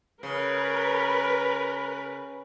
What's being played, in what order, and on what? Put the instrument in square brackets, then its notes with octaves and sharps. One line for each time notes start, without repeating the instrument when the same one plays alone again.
[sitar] C#3 [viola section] A#4 B4